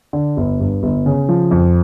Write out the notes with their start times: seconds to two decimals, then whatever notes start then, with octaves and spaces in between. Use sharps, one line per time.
0.13 D3
0.37 G1
0.60 G2
0.83 G1
1.06 C#3
1.29 F3
1.51 F2